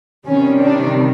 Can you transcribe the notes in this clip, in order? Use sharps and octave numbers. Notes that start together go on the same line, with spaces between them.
C3 D#3 G3 C#4
D4